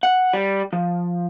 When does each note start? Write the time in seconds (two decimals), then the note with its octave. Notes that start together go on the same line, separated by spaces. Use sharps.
0.03 F#5
0.33 G3
0.73 F3